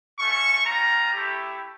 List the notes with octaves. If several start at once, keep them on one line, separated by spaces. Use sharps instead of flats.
A3 C#4 F4 C#6
G3 C#4 F4 A#5
A3 E4 G4